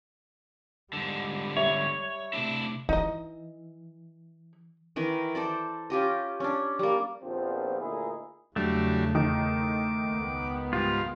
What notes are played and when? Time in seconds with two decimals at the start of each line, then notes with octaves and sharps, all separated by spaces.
0.93 G#2 D3 G3
1.57 C#5 E5
2.33 C3 A3 D4 E4
2.89 E3 D#4 D#5
4.96 D#3 E3 E4 A#4
5.35 A4 C5 D5
5.90 C#4 F4 G4 D#5
6.40 C#4 D4
6.79 G3 A#3
7.22 A#1 D#2 A#2 F3 B3 C4
7.80 D2 A#2 D#4 E4 G#4
8.56 E2 C#3 F#3 G3 A3 D4
9.15 D#3 D6
10.07 C#2 B3
10.73 G#2 G3 F4